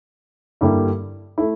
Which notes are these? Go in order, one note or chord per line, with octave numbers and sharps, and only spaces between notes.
G2 D3 G3 A#3 E4
A3 E4